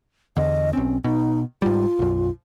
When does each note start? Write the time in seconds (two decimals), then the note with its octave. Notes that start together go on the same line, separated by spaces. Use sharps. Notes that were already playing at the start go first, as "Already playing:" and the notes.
0.37 E2 D3 D#5
0.73 B1 C4 C#4
1.04 B2 D#4
1.62 G#2 G3 F4
1.99 B1 F#2